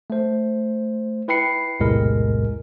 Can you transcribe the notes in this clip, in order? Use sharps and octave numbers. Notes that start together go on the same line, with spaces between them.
A3 C5
E4 B4 G5 B5 C7 C#7
B1 E2 A2 C3 G#3 A#4